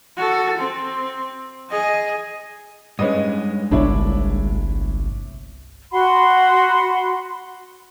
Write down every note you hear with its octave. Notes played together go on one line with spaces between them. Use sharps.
F#4 A4
C4
G#4 D#5
G2 G#3 C#4 B4 D#5
G1 C2 D4 E4 C#5
F#4 F#5 B5 C6